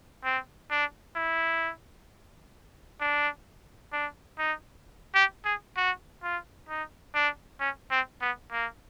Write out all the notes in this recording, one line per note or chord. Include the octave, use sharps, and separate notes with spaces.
C4
D4
E4
D4
D4
D#4
G4
G#4
F#4
F4
D#4
D4
C#4
C4
B3
A#3